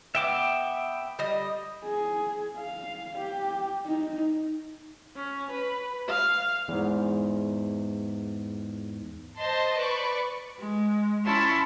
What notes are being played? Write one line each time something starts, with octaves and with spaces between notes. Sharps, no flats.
B3 E5 G5 D6
G3 D#5
G#4
F5
G4
D#4
C#4
B4
F5
E2 G#2
C5 D#5 A5 C6
B4 D5 C#6
G#3
C#4 E4 C#5 A5 B5 C6